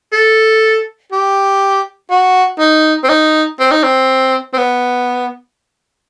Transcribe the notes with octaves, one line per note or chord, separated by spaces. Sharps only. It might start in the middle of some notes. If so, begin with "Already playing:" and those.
A4
G4
F#4
D#4
C4
D#4
C4
D#4
C4
C4
B3